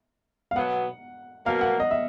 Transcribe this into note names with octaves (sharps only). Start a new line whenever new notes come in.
F5
B2 F#3 B3 F#5
B2 F#3 A#3 F5
F#5
D#5
E5